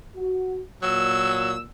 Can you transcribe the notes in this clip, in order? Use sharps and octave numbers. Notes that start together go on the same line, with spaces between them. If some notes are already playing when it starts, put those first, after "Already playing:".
F#4
A#2 F#3 E6